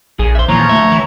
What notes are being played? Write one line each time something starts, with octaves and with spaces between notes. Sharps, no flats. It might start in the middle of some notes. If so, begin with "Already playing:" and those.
A#1 G#4
C5 E5
D#2 A#2 E3 F3 C#5 A#5
D2 A3 E5
E3